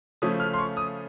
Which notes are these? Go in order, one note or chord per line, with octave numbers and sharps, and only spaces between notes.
C#3 F3 A3 C#4 D#6
F6
C6
C#6
D#6